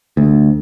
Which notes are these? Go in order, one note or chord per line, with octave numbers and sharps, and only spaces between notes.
D2